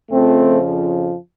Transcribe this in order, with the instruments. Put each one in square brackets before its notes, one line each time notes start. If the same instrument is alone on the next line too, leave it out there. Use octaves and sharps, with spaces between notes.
[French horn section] F2 C#3 F3 A3 C4